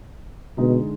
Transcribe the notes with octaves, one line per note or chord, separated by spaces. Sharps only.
B2 D3 G#3 D#4